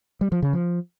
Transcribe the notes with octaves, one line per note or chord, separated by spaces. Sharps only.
G3
F3
C#3
F3